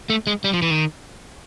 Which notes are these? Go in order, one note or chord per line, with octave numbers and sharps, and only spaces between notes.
A3
G#3
G3
F3
E3
D#3